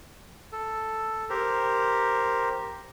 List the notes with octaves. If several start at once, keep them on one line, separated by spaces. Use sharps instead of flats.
A4
G4 A#4 C5